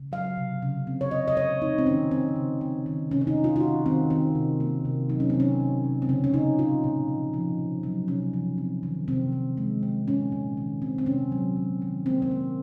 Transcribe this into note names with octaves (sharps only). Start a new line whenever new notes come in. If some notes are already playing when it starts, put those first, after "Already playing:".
Already playing: C#3
F#3 F5
C3
C#3
C4
C#5
C4 D#5
D#5
A#2 C#5
C4 D#4
C4
D#3 C#4
C4
C#3
C4
D#3
C3 C#4
C#4
D#4
C3
F4
F4
D#3 F#4
D#3 C4
D#3 C4
C3
A#3
C3
F#3 D#4
C#4
C4
C3
C#4
C3
C3
C4
C#3 C#4
C#4
C#3 D#4
A#2 F4
A#2
F3
F3
C3
F#3
C3 C#4
F3
C4
D#3
C3 C4
D#3
G#3
C4
A#2 C#4
A#2
D#3
C4
C4
C3 C#4
F#3
F#3
D#3
A#3 C4
C4
A#3